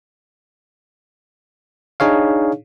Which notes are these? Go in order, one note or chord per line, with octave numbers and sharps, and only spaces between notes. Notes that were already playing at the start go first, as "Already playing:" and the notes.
D4 D#4 G#4 C#5 F5